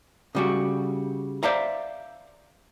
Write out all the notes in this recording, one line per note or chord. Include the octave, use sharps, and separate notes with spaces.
C#3 G3 F#4
C5 D5 E5 F5 A#5